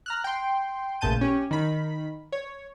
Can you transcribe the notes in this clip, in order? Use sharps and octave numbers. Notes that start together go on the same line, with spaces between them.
A#5 F6 F#6
G5 C6
A1 A#2 C#3 A5 G6 D#7
C#4 G4
D#3 B5
C#5